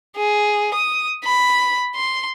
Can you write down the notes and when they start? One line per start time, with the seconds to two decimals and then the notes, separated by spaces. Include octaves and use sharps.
0.17 G#4
0.74 D#6
1.24 B5
1.95 C6